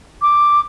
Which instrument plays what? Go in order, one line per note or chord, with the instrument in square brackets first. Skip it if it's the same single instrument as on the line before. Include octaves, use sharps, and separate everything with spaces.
[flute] D6